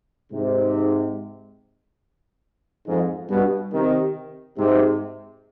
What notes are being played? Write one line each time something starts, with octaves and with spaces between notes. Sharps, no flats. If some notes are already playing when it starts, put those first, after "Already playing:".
G#2 C3
F2 G#2
G2 B2
C3 D#3
G#2 C3